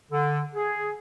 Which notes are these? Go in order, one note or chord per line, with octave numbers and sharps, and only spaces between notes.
D3
G#4